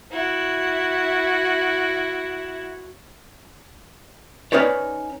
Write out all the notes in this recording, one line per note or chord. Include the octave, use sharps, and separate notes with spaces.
E4 F#4
C#4 D#4 B4 C#5 D5